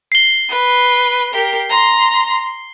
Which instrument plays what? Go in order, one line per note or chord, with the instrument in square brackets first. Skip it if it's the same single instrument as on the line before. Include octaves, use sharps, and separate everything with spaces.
[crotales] C7 G7
[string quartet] B4
G4 A#4
A#5 C6